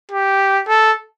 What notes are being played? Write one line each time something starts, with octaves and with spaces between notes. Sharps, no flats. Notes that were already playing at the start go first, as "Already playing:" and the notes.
G4
A4